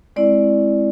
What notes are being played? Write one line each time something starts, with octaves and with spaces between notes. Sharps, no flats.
G#3 C4 E4 D5